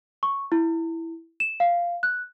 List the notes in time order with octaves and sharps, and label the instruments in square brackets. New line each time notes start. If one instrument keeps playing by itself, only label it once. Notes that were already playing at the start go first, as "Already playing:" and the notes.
[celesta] C#6
E4
E7
F5
F#6